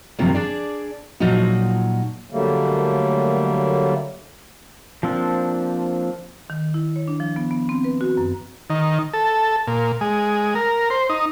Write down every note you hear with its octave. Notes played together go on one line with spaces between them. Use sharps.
G2 C3 D#3 F3 F#3 A#3
D4 G#4 D5
A#2 F3 F#3 D#4 F#4
D3 F#3 G3 A3 A#3
F3 A#3 C4 D4
D#3
E4
C#5
D4
F3
B3
B3
C4
B4
F#4
F#2
D#3
A4
A#2
G#3
A#4
C5
D#4